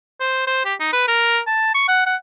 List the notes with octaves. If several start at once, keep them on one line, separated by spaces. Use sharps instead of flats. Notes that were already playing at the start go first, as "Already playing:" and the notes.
C5
C5
G4
D#4
B4
A#4
A5
C#6
F#5
F#5